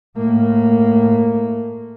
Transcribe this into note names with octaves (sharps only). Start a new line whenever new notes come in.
A2 A#3